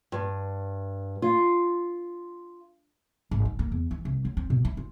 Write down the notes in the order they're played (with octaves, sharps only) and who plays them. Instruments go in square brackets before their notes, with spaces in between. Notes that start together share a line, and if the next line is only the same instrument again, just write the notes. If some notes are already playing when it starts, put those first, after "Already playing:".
[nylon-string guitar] G2
F4
[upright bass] G#1
D#3
A#3
E2
E3
C2
F#3
C4
B2
E4
F4